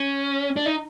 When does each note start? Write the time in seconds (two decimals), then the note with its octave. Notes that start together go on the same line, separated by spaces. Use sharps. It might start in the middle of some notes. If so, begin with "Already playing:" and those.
Already playing: C#4
0.56 D4
0.66 D#4